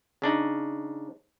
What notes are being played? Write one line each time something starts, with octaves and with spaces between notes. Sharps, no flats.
C#3 D4 D#4